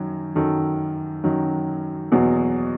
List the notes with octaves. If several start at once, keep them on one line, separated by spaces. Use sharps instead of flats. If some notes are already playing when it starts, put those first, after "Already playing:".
Already playing: F#2 D#3 F#3
F#2 D#3 F#3 A4
F#2 D#3 F#3
E2 B2 F#3